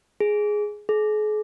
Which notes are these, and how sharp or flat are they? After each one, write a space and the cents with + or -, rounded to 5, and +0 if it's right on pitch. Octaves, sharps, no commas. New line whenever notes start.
G#4 +5
G#4 +40